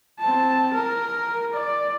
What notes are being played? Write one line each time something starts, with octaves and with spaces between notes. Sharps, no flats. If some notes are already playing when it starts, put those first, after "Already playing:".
C4 A5
A#4
D5